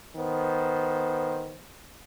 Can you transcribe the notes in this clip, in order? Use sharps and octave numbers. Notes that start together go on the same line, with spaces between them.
D#3 B3 C5